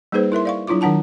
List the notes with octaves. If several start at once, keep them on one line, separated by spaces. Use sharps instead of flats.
G3 A#3 D#4 G#4 B4 C5
E4 A#4 E5 C6
D5 F5 C#6
F#3 D4 E4 F4 D6
D#3 F#3 D4 F#5 A5 A#5